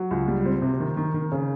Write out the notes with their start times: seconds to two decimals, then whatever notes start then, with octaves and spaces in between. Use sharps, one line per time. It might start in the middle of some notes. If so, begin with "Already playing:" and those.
Already playing: F#3
0.11 C#2
0.28 G3
0.45 C4
0.62 C3
0.80 D#3
0.97 D#3
1.14 D#3
1.32 C#3